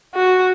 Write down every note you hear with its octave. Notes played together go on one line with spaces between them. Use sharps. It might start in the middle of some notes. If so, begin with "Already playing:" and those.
F#4